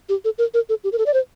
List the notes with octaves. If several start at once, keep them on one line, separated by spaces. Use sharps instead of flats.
G4
A4
A#4
A#4
A4
G4
A#4
A4
D5
C5